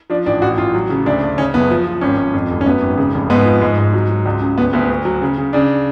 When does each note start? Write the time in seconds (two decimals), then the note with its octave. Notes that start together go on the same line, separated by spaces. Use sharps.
0.10 F3 D4
0.26 A1 D4
0.42 A1 F#4
0.58 A1 F4
0.74 F#3
0.90 C#3
1.06 D2 D4
1.22 D2
1.38 C#3 C#4
1.54 F#1 B3
1.71 F3
1.86 F3
2.01 G#1 C#4
2.18 G#1
2.34 F2
2.50 F1
2.61 C#4
2.66 F#2 B3
2.82 G#1
2.97 C#3
3.14 F1
3.30 G#2 B3
3.45 F3
3.62 G#2
3.78 G#2
3.93 F#3
4.10 F#3
4.26 C#2
4.41 C#3
4.58 D2 B3
4.73 D2 B3
4.90 D2
5.05 F#3
5.22 C#3
5.38 C#3
5.53 C#3 D4